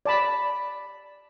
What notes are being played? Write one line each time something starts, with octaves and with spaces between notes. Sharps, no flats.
D5 A5 B5